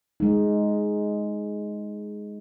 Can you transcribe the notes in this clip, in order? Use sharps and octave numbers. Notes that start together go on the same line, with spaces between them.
G#3 D#4